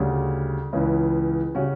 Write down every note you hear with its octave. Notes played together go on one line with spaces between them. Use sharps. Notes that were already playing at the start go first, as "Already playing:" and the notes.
Already playing: D2 C#3 G3
C#2 C#3 E3
C#3 G3 C#4 F#4